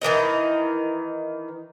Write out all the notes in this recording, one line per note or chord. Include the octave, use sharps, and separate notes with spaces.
D#3 E3 A#4 D#5